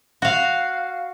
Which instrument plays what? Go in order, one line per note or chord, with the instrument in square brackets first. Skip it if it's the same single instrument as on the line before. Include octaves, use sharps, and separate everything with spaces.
[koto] F#4 F5